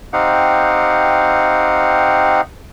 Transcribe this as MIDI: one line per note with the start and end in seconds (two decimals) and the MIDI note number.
0.13 2.41 60
0.13 2.41 63
0.13 2.41 67
0.13 2.41 77
0.13 2.41 78